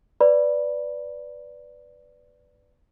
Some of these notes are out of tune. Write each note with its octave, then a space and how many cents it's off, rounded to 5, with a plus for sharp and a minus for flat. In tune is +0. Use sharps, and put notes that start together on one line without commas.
B4 +5 D5 -5 B5 -15